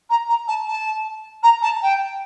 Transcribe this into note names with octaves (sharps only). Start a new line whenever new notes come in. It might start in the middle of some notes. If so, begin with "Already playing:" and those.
A#5
A#5
A5
A5
A#5
A5
G5